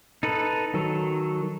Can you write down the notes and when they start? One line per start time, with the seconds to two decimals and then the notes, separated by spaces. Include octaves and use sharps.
0.23 D#4 A4 B4
0.74 D#3 F#3 A4